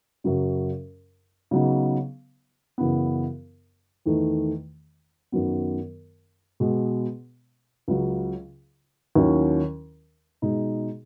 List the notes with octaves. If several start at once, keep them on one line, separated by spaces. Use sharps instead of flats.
F#2 C#3 F#3 C#4
C#3 F#3 B3 D#4
F#2 C#3 E3 B3
E2 D#3 A3
F#2 D#3 F#3 B3
B2 G#3 B3
C#2 C#3 F#3
D#2 D#3 F#3 C#4 E4
B2 G#3 D#4